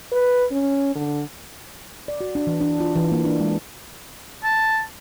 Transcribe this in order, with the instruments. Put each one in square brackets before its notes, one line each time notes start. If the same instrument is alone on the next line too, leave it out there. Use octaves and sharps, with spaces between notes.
[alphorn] B4
C#4
D3
[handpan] D5
F#4
D4
E3
D4
F4
E3
A#3
D4
G#3
[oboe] A5